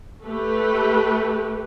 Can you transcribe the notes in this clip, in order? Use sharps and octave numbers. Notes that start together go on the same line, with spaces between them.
A3 G4 B4